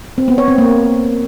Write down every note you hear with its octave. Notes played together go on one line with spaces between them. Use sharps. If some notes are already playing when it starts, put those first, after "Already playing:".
C4
B3
C#5
C4
A#3